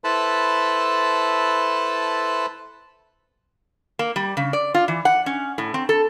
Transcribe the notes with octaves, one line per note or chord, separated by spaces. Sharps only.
E4 A4 B4 C5 A5 B5
A#3
G3
C#3
D5
F4
E3
F#5
C#4
A2
C4
A4